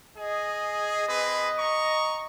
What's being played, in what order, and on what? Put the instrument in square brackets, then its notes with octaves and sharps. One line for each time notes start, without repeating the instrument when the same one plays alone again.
[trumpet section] G#4 [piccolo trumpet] D#5
[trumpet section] C4 G#4 B4
A#5 C#6